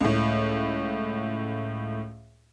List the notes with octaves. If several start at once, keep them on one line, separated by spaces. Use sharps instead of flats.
C#2 A2